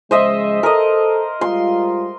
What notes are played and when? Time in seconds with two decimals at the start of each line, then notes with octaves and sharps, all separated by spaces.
0.11 C#3 F3 G#3 C5 D#5 E5
0.63 A4 A#4 D#5
1.41 G3 G#3 F4 C6